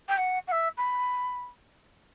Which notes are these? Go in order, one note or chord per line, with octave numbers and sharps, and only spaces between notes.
G5
F#5
F#5
E5
B5